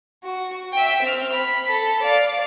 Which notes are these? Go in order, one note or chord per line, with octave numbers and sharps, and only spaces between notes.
F#4
E5 G5
C4 F6
B5
A4
D5 F5